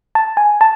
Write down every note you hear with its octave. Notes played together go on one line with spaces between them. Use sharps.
A5
G#5
A5